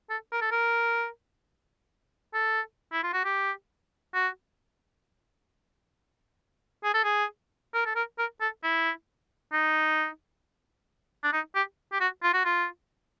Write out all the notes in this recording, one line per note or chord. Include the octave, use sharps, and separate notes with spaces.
A4
A#4
A4
A#4
A4
E4
F4
F#4
G4
F#4
G#4
A4
G#4
A#4
A4
A#4
A#4
A4
E4
D#4
D4
D#4
G4
G4
F#4
F4
F#4
F4